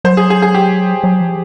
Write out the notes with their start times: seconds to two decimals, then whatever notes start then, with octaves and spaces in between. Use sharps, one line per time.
0.04 F#3 C5
0.17 G#4
0.30 G#4
0.42 G#4
0.54 G4
1.04 F#3
1.20 F3